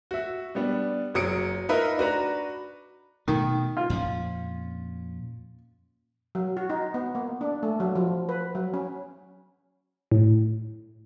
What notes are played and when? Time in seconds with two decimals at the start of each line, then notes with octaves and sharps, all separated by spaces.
0.11 F#4 E5
0.55 G3 B3 D4
1.14 F#1 F#3 D#6 C#7 D7
1.69 D#4 F4 A#4 B4 D#5 E5
1.98 D4 F#4 B4 A#5
3.28 B2 D#3 A3
3.77 F4
3.90 F2 A#2 C#4
6.35 F#3
6.57 F#4
6.70 D#4
6.94 B3
7.15 A#3
7.41 D4
7.63 A3
7.80 F#3
7.95 F3
8.29 B4
8.55 F#3
8.74 C#4
10.11 A2